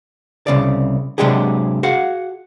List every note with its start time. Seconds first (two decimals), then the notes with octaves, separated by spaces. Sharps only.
0.47 C2 C#3 D5
1.18 C3 F#3 G#3 D4 G4 G#4
1.83 F#4 G#4 F5 F#5